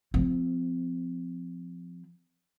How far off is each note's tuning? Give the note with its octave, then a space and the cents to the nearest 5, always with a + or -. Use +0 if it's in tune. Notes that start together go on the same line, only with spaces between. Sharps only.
F3 +0 C4 -20